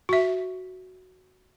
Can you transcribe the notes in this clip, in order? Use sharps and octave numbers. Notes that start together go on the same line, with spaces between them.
F#4 E5